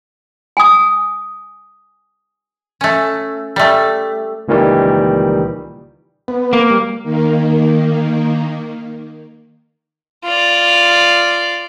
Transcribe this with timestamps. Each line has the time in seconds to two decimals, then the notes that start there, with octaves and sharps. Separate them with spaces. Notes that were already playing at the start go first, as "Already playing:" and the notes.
0.57 G#5 D#6
2.81 A3 C#4
3.56 G3 A3
4.48 C#2 A#2 D#3 E3 G3
6.28 B3
6.53 A#3
6.70 G3
7.03 D#3 A#3
10.24 F4 D5